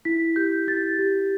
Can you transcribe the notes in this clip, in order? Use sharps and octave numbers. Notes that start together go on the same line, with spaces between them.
E4 B6
G4 G6
E4 A6
G4